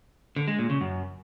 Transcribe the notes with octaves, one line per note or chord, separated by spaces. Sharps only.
D3
G#3
A#2
C#3
F#2